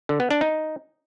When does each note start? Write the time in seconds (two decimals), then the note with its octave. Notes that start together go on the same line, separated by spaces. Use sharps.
0.09 D3
0.20 B3
0.31 D4
0.41 D#4